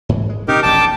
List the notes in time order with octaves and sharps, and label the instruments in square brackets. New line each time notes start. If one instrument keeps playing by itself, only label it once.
[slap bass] G#2 E3
G#3
[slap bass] C3 C#4 [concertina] D#4 G4 A#4
[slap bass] E1 A#1 C3 [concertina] G5 A5 D6